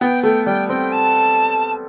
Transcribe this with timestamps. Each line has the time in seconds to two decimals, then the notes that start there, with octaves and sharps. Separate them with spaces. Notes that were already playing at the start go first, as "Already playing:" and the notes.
0.01 B3 G5
0.23 A3 G5
0.46 G3 G5
0.69 C4 G5
0.92 A5